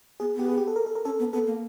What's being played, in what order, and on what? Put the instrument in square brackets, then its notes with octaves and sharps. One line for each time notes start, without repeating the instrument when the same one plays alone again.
[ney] B3 [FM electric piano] G#4
[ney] B3
[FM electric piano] G4
G#4
G4
A4
A#4
A4
A#4
[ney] C#4 [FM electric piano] A4
[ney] B3
[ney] B3 [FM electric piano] A4
[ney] A#3